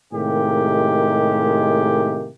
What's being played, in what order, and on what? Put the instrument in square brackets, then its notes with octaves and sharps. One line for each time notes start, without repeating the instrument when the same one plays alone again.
[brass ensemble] A2 C3 D#3 G#3 A#3 G4